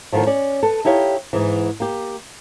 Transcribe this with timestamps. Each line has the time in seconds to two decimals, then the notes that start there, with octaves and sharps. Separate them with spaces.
0.12 A2 D3 D#3 F3 F#3
0.26 C#4 D5
0.63 A4 B4
0.85 D#4 E4 G4 C#5 F5
1.33 G#2 E3
1.80 A#3 G4